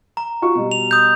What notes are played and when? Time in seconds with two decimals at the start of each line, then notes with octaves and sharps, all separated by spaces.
0.17 A#5
0.42 F4 F#4 C#6
0.55 B2 G3
0.72 F7
0.91 D#6 G6